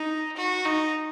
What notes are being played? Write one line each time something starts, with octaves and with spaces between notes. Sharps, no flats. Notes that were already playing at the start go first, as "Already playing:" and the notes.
Already playing: D#4
F#4
D#4